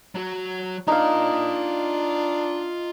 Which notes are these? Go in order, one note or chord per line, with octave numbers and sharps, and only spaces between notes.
F#3 F#4
D4 D#4 F4 F5 A#5